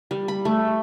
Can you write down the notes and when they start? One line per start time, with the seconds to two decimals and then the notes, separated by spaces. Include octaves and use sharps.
0.11 G3
0.28 B5
0.45 A3